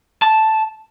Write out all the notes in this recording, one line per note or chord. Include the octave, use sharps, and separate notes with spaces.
A5